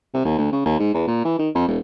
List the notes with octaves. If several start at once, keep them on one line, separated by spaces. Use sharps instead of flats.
C3
D#2
D2
C#3
D#2
G#2
E2
A#2
E3
D#3
F2
E1